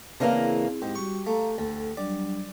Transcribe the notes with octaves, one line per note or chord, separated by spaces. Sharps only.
C#3 E3 A#3 C4 D4 E4 G#4 A#4
G#2 G4
G3 F#4 C#6
A3 F5 A#5
D2 A4
F#3 G3 D4 D5